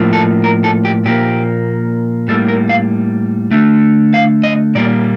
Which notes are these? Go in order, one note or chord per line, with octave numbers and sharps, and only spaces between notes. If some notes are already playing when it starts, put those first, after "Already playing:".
Already playing: A2 F3 A#3
A4
A#4
A4
G4
A#2 F3 A#3 G4
A2 G3 A#3 A4
A#4
F5
D3 A3
F5
D#5
A#2 G3 A#3 D5